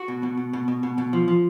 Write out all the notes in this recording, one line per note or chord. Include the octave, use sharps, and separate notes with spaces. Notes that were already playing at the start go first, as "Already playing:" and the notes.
Already playing: F#4
B2
B2
B2
B2
B2
B2
B2
F3
F3